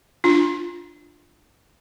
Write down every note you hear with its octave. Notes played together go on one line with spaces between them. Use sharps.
D4 F4